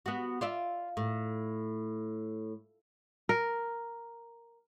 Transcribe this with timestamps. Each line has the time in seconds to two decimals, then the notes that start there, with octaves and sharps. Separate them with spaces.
0.06 B3 F#4
0.41 F4 D5 E5
0.97 A2
3.29 A#4